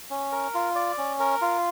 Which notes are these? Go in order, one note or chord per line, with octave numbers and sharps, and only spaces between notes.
C#4
A#4
F4
D5
C#4
A#4
F4